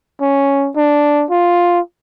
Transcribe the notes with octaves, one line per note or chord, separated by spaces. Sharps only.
C#4
D4
F4